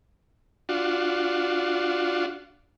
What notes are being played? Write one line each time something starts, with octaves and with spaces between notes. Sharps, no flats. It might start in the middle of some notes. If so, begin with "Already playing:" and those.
D4 F4 F#4